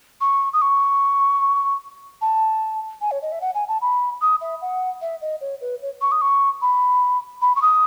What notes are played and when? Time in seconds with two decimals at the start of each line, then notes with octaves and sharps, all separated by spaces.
0.21 C#6
0.53 D#6
0.62 C#6
2.22 A5
3.01 G#5
3.11 C#5
3.22 D#5
3.32 E5
3.41 F#5
3.55 G#5
3.68 A5
3.81 B5
4.22 D#6
4.41 E5
4.62 F#5
5.02 E5
5.21 D#5
5.41 C#5
5.61 B4
5.82 C#5
6.02 C#6
6.12 D#6
6.21 C#6
6.62 B5
7.42 B5
7.56 C#6
7.62 D#6